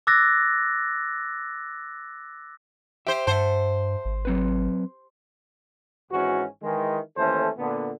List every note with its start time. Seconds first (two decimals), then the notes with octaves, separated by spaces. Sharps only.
0.07 D6 E6 F#6 A6 A#6
3.07 G4 C5 E5
3.27 G2 C5 E5 F#5 A5
4.05 G#1
4.25 F#3 C4 B4
6.11 G#1 G#2 E3 C#4 F#4
6.63 D#3 E3 G#3
7.17 D#2 E3 A3 C#4 A4 C5
7.58 A#2 D3 B3